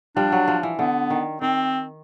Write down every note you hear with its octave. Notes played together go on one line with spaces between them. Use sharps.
F3 G3 D4
F#3
F3
E3
D3 B3
D#3
D#3 C4